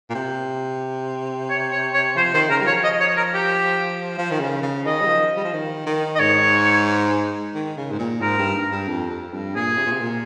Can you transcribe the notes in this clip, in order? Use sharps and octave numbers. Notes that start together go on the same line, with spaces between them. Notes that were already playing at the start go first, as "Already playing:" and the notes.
A#2
C3
C#5
C#5
C#5
F3 C5
D#3 C5
C#3 A#4
G3
F3 C#5
D#5
C#5
A#4
G4
F3
D#3
C#3
C#3
D#3 D#5
G3
F3
G3
F3
D#3
D#3
D#5
G#2 C#5
D#3
C#3
G#2
A#2
G#2 A#4
G2
G2
F2
F2
G2
A#2 G#4
C3
A#2
C3
A#2